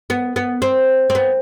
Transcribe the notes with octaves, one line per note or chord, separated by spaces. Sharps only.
B3
B3
C4
C4
B3